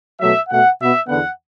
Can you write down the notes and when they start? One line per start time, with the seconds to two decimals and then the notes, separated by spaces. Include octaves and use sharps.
0.19 B2 F#3 A3 E5
0.49 B2 A3 F#5
0.79 B2 B3 E5
1.08 E2 D3 B3 F#5